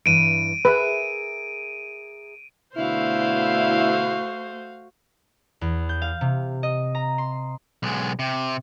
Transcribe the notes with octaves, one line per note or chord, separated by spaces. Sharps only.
G2 E3 D7 D#7
G#4 A#4 B4 E5
B2 D3 A3 E4 F#4 C5 F5
E2
G6
F5
C3
D#5
A#5
C6
B1 G#3
C3